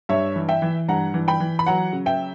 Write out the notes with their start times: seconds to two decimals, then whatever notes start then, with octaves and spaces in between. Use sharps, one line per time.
0.09 G2 C#5 E5
0.36 E3
0.49 E5 G5
0.62 E3
0.88 G2 F#5 A#5
1.14 E3
1.28 G5 B5
1.40 E3
1.59 B5
1.66 F#3 F#5 A#5
1.93 C#3
2.06 E5 G5